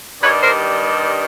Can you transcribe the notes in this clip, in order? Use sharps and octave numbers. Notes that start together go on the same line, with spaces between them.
G2 D#3 G3 B4 C#5
A#4 C5